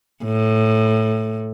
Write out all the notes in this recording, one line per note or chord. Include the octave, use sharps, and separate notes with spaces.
A2